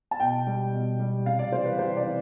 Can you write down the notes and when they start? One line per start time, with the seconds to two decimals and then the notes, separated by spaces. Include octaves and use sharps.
0.11 A5
0.20 B2 G5
0.47 G3
0.73 B2
0.99 G3
1.26 C3 F5
1.39 D5
1.52 E3 G3 C5
1.66 B4
1.79 C3 C5
1.97 D5
2.06 E3